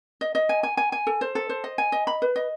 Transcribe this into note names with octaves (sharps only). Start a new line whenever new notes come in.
D#5
D#5
G#5
G#5
G#5
G#5
A4
C5
A4
C5
D#5
G#5
D#5
B5
B4
D#5